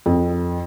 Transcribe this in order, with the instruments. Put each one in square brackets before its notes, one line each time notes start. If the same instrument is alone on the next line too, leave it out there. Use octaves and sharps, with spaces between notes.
[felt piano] F2